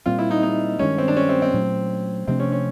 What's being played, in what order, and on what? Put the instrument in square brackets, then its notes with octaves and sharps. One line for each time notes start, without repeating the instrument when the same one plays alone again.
[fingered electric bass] A#2 G3 C4 [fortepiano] F4
[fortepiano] E4
D#4
D#4
[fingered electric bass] G2 D#3 G#3 [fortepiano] C#4
[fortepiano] C4
D4
C#4
C4
C4
[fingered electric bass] A#2 F#3 A3
[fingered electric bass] C3 F3 A3 D4 [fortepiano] C4
[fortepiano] C#4
C#4